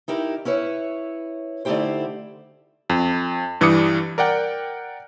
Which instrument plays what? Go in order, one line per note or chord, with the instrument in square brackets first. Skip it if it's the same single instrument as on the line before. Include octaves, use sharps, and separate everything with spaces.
[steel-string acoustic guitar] D#4 E4 G4 A#4
C#4 E4 B4 C#5
D3 A3 D#4 E4 G4 C5
[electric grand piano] F2
G2 E3 G3 D6 D#6 C#7
A#4 D5 F#5 G5